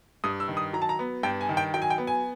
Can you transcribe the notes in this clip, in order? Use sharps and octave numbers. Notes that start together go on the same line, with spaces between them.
G2 D#6
E6
D#3
D#6
F#3 A#5
A5
A#5
B3
G2 G5
G#5
D#3
G5
F#3 G5
G#5
G5
B3
G#5